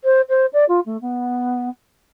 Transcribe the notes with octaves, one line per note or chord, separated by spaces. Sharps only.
C5
C5
D5
F4
A3
B3